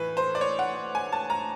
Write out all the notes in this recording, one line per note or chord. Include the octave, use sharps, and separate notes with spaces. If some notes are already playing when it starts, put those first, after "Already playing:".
Already playing: A2 E3 B4
C5
D5
C#5
F#5
G#5
A5
A#5